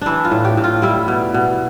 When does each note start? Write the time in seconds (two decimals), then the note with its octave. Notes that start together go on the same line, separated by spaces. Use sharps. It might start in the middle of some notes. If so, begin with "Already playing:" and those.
0.01 E3 D4 E4
0.25 F4
0.31 A2
0.45 G4
0.57 A2
0.64 F4
0.82 G3 E4
1.08 B2
1.34 B2